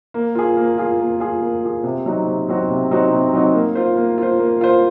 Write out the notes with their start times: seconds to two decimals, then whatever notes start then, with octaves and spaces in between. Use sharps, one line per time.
0.14 A#3
0.35 F4 G#4
0.57 A#3
0.78 F4 G#4
1.00 A#3
1.20 F4 G#4
1.42 A#3
1.63 F4 G#4
1.84 C3
2.06 F#3 C4 D#4 F#4
2.27 C3
2.48 F#3 C4 D#4 F#4
2.69 C3
2.91 F#3 C4 D#4 F#4
3.12 C3
3.33 F#3 C4 D#4 F#4
3.54 A#3
3.75 F4 C5
3.97 A#3
4.18 F4 C5
4.39 A#3
4.61 F4 C5